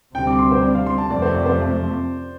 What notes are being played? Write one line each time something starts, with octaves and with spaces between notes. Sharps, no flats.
D2 C3 G3 C4 G5
D6
C6
C5
D5
F5
C6
A5
F2 C3 F3 A3 C4 D5
C5
D5
C5